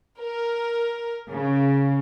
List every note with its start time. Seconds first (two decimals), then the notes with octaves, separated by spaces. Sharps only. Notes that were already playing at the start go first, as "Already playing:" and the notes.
0.19 A#4
1.31 C#3